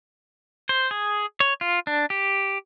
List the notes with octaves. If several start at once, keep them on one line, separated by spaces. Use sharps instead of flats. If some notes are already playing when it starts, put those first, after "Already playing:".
C5
G#4
C#5
F4
D4
G4